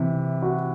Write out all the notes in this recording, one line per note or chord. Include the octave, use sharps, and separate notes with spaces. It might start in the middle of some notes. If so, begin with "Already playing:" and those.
Already playing: C3 E3
F#4